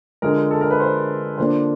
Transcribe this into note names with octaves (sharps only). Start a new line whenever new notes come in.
D3 F3 G#3 A#4
A4
A#4
B4
C5
D3 F3 A#3 D4 C5